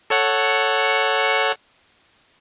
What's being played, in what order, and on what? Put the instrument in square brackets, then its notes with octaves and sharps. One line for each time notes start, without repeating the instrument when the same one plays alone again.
[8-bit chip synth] A4 C#5 F#5